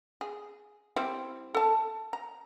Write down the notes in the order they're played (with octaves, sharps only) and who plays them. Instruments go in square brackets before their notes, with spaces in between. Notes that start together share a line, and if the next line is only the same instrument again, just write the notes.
[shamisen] G#4
G3 C4 E4
A4 A5
A#5